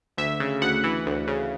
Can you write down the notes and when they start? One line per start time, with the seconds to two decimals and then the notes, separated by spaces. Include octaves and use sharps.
0.18 D2 E5
0.40 C#3
0.62 D2 F#5
0.84 E3
1.06 D2
1.28 C#3